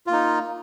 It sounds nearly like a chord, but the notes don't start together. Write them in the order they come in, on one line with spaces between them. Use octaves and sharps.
F4 A#3 D#4